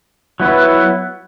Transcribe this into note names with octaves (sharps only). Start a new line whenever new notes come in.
F#3 B3 E4 B4